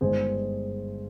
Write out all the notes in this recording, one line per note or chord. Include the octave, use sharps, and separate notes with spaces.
G1 G2 D#3 G#3 G#4 C5